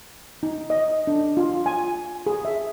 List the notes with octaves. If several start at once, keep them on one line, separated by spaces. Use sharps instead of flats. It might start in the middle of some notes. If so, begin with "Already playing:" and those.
D#4
D#5
D4
F4
G#5
G#4
E5